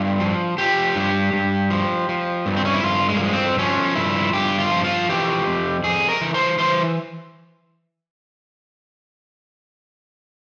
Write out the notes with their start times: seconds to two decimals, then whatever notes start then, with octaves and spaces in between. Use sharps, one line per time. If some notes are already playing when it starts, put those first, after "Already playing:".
Already playing: G2 F4
0.20 F3
0.58 F3 G4
0.96 G2
1.33 G2
1.70 F3
2.09 F3
2.46 G2
2.57 C4
2.65 C#4
2.74 E4
2.84 G2 F4
3.09 G#3
3.16 A#3
3.21 F3 G#3
3.33 C4
3.58 F3 C#4
3.95 G2 E4
4.33 G2 G4
4.58 F4
4.71 F3
4.84 F4
5.09 E3 G4
5.46 F2
5.84 F2 G#4
6.09 A#4
6.21 E3
6.34 C5
6.58 E3 C5